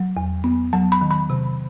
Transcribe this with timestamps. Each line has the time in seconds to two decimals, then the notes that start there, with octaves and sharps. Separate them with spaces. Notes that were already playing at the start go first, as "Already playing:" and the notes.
Already playing: F#3
0.17 E2
0.44 B3
0.73 F#3 A5
0.92 B5
1.01 D#3
1.11 B5
1.30 C3